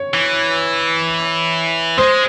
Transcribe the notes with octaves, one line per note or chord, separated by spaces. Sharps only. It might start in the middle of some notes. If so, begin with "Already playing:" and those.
Already playing: C#5
E3
G#3 C5